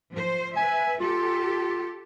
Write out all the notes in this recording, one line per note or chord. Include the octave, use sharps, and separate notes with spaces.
F3 C5
B4 E5 G#5
F4 G4 A4